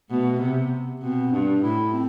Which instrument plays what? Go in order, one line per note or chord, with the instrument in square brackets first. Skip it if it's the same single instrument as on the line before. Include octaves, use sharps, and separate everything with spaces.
[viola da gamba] B2 [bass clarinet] A3
[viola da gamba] C3 [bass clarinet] B3
[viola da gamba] B2 [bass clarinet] C4
[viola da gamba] G2 [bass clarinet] D4
[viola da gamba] A2 [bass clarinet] E4
[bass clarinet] C4